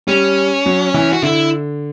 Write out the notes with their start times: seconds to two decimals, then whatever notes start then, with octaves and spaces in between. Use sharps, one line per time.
0.08 G3 C#4
0.66 F#3
0.94 E3
1.12 F#4
1.22 D3 E4